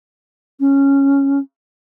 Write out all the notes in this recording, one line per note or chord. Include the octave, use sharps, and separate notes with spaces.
C#4